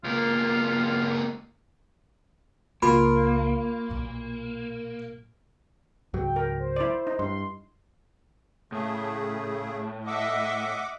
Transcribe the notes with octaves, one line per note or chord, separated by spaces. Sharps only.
C#2 A#3 F4
C#2 A#3 F4 B5
B1 A#2
C#2 G#2 F#3 G5
A#4
C5
E4 D5
D#4
G2 C6
A2 C#3 A3 G#4
D#5 E5 F#5 D6